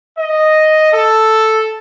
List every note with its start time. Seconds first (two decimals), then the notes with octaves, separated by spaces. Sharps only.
0.18 D#5
0.93 A4